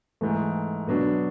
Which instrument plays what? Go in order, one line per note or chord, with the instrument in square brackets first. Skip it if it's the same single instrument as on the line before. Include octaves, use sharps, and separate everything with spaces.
[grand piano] G#2 E3 A3
B2 F#3 B3 D4